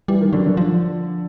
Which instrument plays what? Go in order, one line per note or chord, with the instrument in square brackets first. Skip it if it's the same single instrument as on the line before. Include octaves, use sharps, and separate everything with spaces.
[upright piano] E3 [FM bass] G3
[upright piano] D#3
[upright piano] D3 [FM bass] F#3
[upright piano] D3
[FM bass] F3